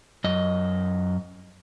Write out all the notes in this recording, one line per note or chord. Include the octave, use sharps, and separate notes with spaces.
F#2 D#5